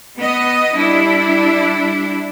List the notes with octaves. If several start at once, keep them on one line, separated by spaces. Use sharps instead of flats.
B3 D#5
G3 D4 E4